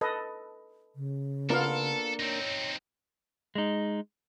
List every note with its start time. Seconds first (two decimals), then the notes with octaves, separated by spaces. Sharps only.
0.01 A4 B4 D#5
0.95 C#3
1.50 A#3 B3 D4 F4 A4 A#4 F5
2.20 C4 D#4 C#5
3.55 G#3 D#4